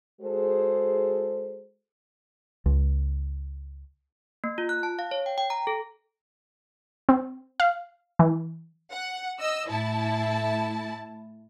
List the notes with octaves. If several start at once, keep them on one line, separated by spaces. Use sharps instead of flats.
G#3 F#4 G#4 A4 C5
C#2
A#3
F4
F#6
A5
F5
C#5
G5
G5
A#5
A4
C4
F5
E3
F#5
D#5 E6
A2 E4 A5